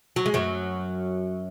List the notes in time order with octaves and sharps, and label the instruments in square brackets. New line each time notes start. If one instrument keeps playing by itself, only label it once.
[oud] F#3
G#3
F#2 F#3